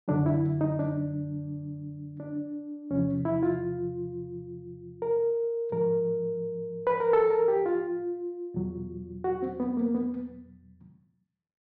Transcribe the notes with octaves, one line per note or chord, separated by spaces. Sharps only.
F#2 D3 F#3 D4
E4
D#4
D4
D4
E2 C3 F3 C#4
E4
F4
A#4
G#2 F3 A#4
B4
A#4
A4
A#4
G4
F4
E2 B2 F#3
F#4
C4
B3
A#3
B3